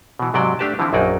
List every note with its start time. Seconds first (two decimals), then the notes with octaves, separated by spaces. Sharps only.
0.19 B2 E3
0.34 G#2 C3 F#3 D5 G5
0.59 A3 D4 G4 B4 A5
0.79 D3 E3 F3 C4 E4
0.93 A#1 F#2 F#3 A#3 D#4 D5